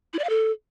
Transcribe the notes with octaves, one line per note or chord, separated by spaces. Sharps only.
E4
D5
F5
A4